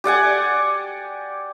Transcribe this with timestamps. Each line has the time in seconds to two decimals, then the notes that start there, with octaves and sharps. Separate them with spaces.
0.04 G4 D5 F#5 G#5